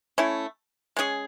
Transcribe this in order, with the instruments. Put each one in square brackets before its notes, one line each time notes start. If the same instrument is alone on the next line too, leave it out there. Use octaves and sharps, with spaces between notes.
[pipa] A3 C#4 E4
G#3 C#4 G#4